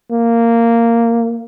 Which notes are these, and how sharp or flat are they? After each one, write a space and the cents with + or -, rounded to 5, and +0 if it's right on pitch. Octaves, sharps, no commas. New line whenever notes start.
A#3 -10